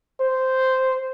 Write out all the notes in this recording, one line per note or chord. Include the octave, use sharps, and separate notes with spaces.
C5